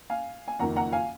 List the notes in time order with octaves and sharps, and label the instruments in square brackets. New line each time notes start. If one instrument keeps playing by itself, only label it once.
[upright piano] F5 G#5
G#5
F#1 F2 D#3 F#5 A#5
F#5 A#5
F5 G#5